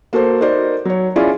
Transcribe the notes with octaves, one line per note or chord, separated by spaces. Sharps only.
A#3 F#4 A4 C5
D#4 F#4 A#4 C5 D5
F#3 C#5
C#4 E4 F4 G#4 D5